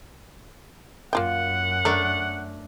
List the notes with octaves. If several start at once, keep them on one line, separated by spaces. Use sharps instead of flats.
F#2 A#3 F4 F#5 G5
A3 D4 A#4